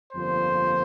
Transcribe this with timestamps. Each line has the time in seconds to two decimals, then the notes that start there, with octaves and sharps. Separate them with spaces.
0.13 G1 F2 D3 F3 A#3 C5